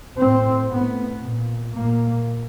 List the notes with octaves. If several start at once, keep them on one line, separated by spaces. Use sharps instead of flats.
A2 C4
A2 B3
A#2
A#2 A#3